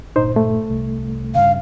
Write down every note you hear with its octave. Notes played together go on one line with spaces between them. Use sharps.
G1 A#2 D4 D#4 C5
A3
C2
G2 C#3 F5